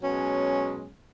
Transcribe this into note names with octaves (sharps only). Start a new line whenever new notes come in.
B2 F#3 G#3 C#4